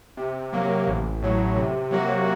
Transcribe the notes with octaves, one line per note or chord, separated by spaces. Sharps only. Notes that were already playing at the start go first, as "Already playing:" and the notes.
C3
F#3 A#3
A1
A2 F#3
C3
F#3 A#3 F#4